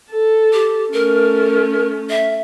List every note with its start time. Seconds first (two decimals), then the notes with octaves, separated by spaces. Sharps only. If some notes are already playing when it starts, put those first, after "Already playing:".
0.11 A4
0.53 G4
0.93 A3 C#4 A#4
2.09 E5